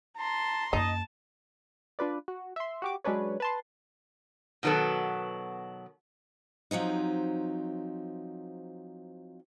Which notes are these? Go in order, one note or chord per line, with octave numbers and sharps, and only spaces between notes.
A5 A#5 C6
F#2 A#3 D#4 D#5 A5
D4 F4 B4 D5
F#4
E5 C6
F#4 G4 D6
F#3 G#3 C#4 D4 B4 C#5
B4 A5 C6
B2 D#3 F#3 B3 A4
F3 F#3 C4 D#4